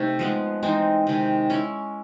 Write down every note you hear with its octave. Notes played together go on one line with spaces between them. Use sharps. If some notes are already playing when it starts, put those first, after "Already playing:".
Already playing: C3 A3 D#4
F3 G#3 B3
E3 G#3 C4 D#4
C3 D#3 G#3
G#3 C#4 E4